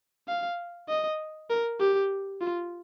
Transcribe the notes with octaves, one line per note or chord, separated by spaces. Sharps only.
F5
D#5
A#4
G4
F4